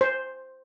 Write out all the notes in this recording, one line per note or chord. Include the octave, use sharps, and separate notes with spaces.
C5